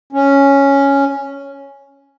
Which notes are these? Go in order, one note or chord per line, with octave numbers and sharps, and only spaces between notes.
C#4